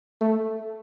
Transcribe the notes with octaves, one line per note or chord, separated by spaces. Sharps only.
A3